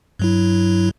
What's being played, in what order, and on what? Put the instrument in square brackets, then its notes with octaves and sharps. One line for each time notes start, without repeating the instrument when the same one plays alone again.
[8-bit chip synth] G2 F#3 E4